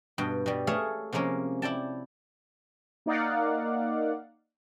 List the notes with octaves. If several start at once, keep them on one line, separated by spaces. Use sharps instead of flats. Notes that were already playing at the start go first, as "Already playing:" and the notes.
G2 B2 G5
B2 G3
A3 G#4 A4 C#5 E5 F5
C3 F3 G#3 A#3 C#4
E4 D5 G5 A5
A#3 D#4 D5 F5 F#5